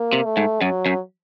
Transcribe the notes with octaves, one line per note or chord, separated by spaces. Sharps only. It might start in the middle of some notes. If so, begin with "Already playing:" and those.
Already playing: A#3
C3
A3
G#2
F#2 F#3
F#2